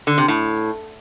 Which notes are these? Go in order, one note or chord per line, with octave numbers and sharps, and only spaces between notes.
D3
C3
A2